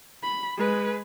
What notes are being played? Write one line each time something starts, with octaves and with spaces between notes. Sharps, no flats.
B5
G#3 B4